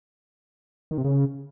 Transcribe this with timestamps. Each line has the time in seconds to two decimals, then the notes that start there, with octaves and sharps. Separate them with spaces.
0.91 D#3
0.98 C3
1.04 C#3